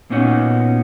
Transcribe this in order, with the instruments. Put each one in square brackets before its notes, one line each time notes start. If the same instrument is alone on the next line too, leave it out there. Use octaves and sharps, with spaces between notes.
[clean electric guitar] A#2 B3 C#4 D#4 F#4